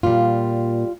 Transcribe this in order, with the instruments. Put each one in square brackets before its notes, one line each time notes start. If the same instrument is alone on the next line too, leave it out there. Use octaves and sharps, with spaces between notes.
[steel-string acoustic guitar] A#2 G3 F4